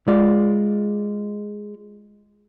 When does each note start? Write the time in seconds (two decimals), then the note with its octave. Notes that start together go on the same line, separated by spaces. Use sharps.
0.08 G#3 F4 D5